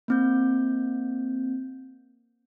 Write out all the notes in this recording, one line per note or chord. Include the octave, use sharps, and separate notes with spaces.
A#3 C4 G6